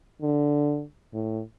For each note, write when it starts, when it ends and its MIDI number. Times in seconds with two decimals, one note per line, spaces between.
0.22 0.83 50
1.14 1.42 45